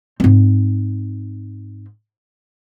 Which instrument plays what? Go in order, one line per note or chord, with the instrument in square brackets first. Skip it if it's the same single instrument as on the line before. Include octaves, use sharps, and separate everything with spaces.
[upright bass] G#2 C4